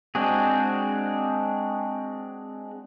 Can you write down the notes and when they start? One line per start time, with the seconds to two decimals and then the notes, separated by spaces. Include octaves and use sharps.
0.15 G#3 C4 D4 F#4 G#4